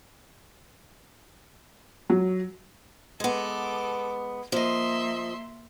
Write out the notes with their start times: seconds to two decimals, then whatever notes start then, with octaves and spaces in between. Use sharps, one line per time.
2.10 F#3
3.20 G#3 B3 A4 D6
4.52 F3 A#3 D#5 E5 C6